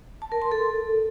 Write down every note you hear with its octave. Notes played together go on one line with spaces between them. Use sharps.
A5
A#4
C6
A4